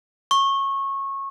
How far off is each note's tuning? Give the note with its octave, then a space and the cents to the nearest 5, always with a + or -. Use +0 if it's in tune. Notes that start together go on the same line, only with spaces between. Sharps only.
C#6 -20